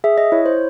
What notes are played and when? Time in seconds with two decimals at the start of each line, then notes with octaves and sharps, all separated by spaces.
0.04 G#4 E5
0.18 D#5
0.32 E4 C#5
0.46 C5